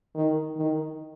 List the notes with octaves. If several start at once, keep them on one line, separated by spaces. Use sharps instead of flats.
D#3
D#3